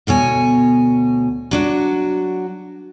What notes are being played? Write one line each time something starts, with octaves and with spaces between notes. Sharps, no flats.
D2 B2 C#5 G#5
F#3 D4 F#4